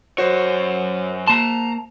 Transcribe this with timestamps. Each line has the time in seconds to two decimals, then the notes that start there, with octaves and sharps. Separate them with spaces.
0.18 F#2 F#4 C5 C#5
1.28 A#3 A5 A#5 C6